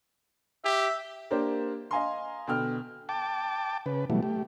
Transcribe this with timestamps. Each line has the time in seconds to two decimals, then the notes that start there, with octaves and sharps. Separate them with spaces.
0.65 G4 E5
1.31 A#3 D4 G4 A#4 C5
1.91 D#5 F5 G#5 A#5 C6
2.47 B2 D3 G5 F6
3.09 G5 A5 D6
3.86 C#3 B4
4.10 B2 E3 F#3 G3 A3
4.23 A3 G4